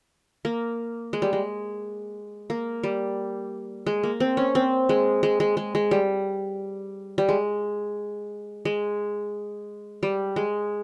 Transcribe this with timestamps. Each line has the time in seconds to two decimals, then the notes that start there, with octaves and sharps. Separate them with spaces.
0.45 A#3
1.13 G#3
1.22 G3
1.33 G#3
2.50 A#3
2.83 G3
3.86 G#3
4.03 A#3
4.20 C4
4.37 C#4
4.55 C4
4.89 G#3
5.23 G#3
5.40 G#3
5.57 G#3
5.75 G#3
5.91 G3
7.18 G3
7.29 G#3
8.65 G#3
10.03 G3
10.36 G#3